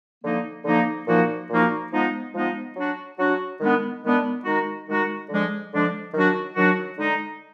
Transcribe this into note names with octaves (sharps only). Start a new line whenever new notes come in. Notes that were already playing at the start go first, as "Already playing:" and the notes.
D3 F3 A#3 D#4
D3 F3 A#3 D#4
A#2 F3 A#3 D#4 F#4
A#2 F3 A#3 D#4 F#4
F3 G#3 B3 D#4
F3 G#3 B3 D#4
F#3 D4 F#4
F#3 D4 F#4
D#3 G#3 B3 D4
D#3 G#3 B3 D4
D#3 G#3 D#4 F#4
D#3 G#3 D#4 F#4
D3 F3 G#3 D4
D3 F3 G#3 D4
D#3 F#3 D4 F#4
D#3 F#3 D4 F#4
D3 G#3 D#4